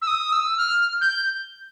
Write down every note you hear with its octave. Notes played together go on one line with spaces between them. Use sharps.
E6
D#6
E6
F6
G6